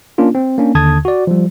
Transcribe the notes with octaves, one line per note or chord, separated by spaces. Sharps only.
A#3 C#4 D4 F4
C4
A#3 C#4 D4
D#2 D3 A5 D#6 G#6
F#4 D5
F3 G3